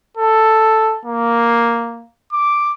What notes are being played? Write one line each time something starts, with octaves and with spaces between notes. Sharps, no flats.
A4
A#3
D6